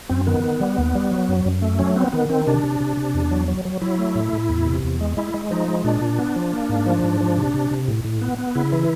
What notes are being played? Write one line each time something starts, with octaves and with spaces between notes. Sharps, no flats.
F#2 C4
D#3 B3
D#3
G3
D#2
G3
F#3
F#2
F#2
A3
F#3 C#4
B3 C4
D#3 B3
D#3 C4
C3 D4
C3
C3
C3
E2
F#3
F#3
F#3
F#3 E4
A3
A2
A2
E2
C3
E2
G#3
G#3 E4
G#3
F3 D#4
G#3
A#2 D4
A#2
B3
F3
A#3
G#2
F3
G#2
F3
C3
C3
C3
A2
A2
B3
B3
C#3 E4
E3